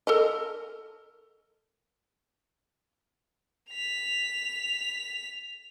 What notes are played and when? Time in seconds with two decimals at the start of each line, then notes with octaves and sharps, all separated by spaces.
0.07 A4 A#4 D#5
3.71 B6 F7